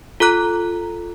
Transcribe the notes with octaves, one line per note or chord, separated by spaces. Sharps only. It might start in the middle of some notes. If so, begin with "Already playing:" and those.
F4 A4 A#5 F#6